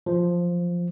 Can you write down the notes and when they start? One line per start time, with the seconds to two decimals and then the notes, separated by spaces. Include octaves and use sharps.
0.06 F3